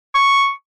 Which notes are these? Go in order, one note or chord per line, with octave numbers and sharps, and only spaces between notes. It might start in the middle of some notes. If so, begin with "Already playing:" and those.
C#6